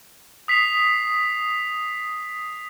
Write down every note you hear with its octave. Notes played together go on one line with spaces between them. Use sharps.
D#6 B6 C7 F7